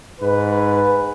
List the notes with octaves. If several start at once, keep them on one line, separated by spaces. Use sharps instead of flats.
G#2 B4